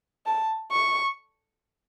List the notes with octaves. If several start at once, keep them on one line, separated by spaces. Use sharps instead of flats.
A5
C#6